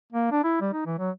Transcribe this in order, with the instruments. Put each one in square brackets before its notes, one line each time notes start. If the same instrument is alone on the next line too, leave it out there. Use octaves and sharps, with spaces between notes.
[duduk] A#3
D4
E4
G3
D#4
E3
F#3